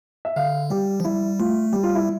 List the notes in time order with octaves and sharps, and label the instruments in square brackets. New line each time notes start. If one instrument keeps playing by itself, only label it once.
[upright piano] E5
[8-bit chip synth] D3 [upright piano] F5
[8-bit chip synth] G3 [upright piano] G4
[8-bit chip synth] F3
[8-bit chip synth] G3 [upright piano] E4
[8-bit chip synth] A3 [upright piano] F4
[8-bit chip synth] G3 [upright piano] G4
[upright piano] F4
E4